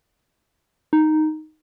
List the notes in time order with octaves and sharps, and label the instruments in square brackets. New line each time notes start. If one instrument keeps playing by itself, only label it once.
[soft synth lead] D#4